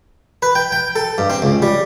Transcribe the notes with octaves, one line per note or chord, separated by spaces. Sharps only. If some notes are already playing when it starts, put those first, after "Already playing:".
B4
G5
G5
A4
G2
C4
C#2
G3